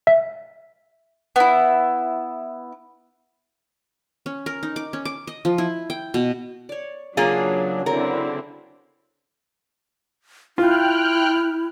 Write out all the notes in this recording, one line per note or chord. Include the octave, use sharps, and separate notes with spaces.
E5
B3 E4
C#4
A#4
D#4
D6
C#4
D6
D#5
F3
E4
G5
B2
C#5 D5
C#3 F#3 A#3 C#4 D4 F4 G#4
D3 F#3 C4 E4 A#4
E4 F4 G5 F6 F#6